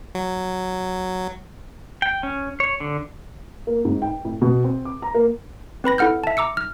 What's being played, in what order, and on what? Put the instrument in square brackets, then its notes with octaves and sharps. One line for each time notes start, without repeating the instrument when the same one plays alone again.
[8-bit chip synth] F#3
[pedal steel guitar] G5
C#4
C#5
D3
[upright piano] A#3
G#2
G5
A2
B2
C4
D6
A#5
A#3
[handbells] C4 B4 B5 A#6
E4 A4 F#5 F6 G6
E5 A5
A#5 D6 E6 C#7
F6